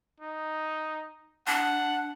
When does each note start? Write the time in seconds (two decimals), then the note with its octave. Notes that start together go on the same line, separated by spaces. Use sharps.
0.20 D#4
1.47 D4 F#5